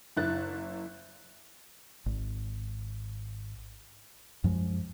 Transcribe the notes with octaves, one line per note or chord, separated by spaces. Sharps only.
F#1 E4 F#6 A6
G#1
F#2 F3 G#3